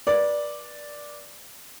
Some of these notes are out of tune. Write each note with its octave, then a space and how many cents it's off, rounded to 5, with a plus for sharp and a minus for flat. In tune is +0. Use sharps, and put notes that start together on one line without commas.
B4 -35 D5 +0